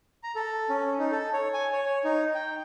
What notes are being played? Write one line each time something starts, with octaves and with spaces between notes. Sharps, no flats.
A#5
A4
C#4
D#4
A4
C#5
G#5
C#5
C#5
D#4
G5